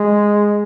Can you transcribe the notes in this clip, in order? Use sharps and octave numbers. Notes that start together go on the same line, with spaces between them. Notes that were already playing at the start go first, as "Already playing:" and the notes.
Already playing: G#3